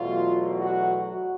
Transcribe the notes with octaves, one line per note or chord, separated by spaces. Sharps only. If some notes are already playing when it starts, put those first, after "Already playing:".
Already playing: E2 B2 F#3 A3 F4
F#4
F#4